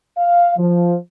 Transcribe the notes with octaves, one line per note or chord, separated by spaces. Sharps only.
F5
F3